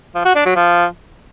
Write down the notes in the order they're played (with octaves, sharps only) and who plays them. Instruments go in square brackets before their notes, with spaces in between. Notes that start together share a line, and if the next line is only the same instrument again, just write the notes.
[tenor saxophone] F3
F#4
D4
F#3
F3